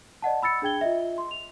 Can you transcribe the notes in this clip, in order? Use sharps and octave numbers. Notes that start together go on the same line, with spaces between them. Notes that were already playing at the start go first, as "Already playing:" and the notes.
D5 D#5 F#5 A5
B5 E6 A6 C#7
D4 G#4 G5 G#6 G7
F4 D#5 E5
C6
F7